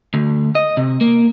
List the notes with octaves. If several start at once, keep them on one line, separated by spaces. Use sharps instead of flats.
D2
D#5
C3
A#3